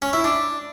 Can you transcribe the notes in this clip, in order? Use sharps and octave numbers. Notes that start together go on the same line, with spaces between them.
C#4
E4
D4